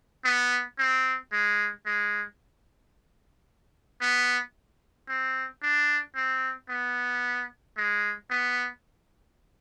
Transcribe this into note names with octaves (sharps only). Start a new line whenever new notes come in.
B3
C4
G#3
G#3
B3
C4
D4
C4
B3
G#3
B3